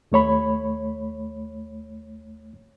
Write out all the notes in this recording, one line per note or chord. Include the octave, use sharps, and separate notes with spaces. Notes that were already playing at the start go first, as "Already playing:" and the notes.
D#2 A3 C#5 B5